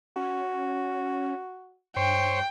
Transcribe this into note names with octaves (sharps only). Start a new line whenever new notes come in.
C#4 F#4
G2 C5 C#5 G5